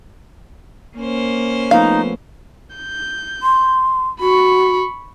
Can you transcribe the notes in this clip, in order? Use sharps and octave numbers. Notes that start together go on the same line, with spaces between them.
A#3 C#4 C5
F3 A3 B3 D#4 F5
G6
C6
F#4 B5 C#6